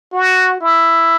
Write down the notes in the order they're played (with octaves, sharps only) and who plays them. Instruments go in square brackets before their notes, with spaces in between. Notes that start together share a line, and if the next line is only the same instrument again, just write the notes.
[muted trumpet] F#4
E4